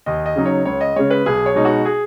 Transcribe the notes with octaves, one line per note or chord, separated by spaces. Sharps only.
D#2 D#5
D#5
C#3 F#3 D#4
C#5
C#2 C#5
D#5
C#3 G#3 C#5
B4
B1 G#4
C#5
B2 G#3 D#4
F#4
G#4